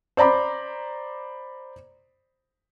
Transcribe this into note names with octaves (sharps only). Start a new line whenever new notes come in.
C5 D5 A#5 B5 D6